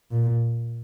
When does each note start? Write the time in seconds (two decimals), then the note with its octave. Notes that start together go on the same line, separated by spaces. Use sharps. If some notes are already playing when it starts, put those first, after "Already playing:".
0.11 A#2